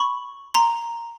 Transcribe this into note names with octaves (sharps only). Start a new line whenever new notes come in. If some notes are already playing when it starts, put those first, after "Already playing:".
Already playing: B5 C#6
A#5 C6